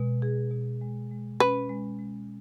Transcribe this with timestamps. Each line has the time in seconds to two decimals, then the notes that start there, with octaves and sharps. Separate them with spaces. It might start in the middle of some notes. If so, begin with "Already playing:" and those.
Already playing: B2 G#3
0.22 G#4
0.51 B2
0.81 G#3
1.11 G#3
1.40 C#4 B4
1.69 G#3
1.99 G#3